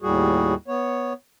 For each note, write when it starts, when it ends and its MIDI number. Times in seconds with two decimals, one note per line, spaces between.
0.02 0.54 39
0.02 0.54 45
0.02 0.54 55
0.02 0.54 66
0.02 0.54 68
0.68 1.13 59
0.68 1.13 73